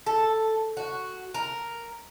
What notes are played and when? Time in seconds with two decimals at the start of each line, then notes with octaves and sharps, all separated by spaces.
0.06 A4
0.77 F#4
1.34 A#4